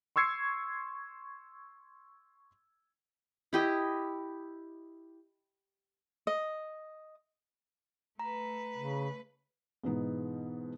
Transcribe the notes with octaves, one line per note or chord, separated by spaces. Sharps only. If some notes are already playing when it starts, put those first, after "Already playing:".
C6 C#6 E6 G#6 C7 C#7
E4 G4 D#5
D#5
A3 B4 A#5
C#3
G#2 B2 E3 B3 D#4